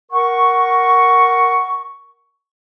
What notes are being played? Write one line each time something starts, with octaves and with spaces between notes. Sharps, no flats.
A#4 F#5 C#6